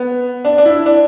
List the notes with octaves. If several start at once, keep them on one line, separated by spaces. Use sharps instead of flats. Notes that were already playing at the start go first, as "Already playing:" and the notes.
Already playing: B3
D4
D4
E4
D4